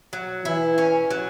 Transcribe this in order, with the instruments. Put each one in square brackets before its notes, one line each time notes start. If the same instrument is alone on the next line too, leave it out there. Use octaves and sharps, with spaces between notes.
[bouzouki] F#3
[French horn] E3 [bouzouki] E4
[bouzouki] C#4
F#3